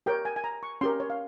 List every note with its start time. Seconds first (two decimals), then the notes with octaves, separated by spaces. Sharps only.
0.06 G4 A#4 C#5 G5
0.25 G#5
0.36 G#5
0.44 A#5
0.63 C#6
0.81 C#4 G4 A#4 C6
1.00 C#5
1.10 F5